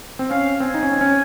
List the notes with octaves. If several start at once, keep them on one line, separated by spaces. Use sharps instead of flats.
C4
C#4 F5
C4 G#5
D#4
C#4
C4
C#4